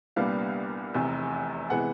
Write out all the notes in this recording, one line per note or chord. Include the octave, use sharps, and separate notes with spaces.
C2 A#2 G3 B3 D4 F5
F1 E2 C3 E3
C3 E3 G#3 B3 F#5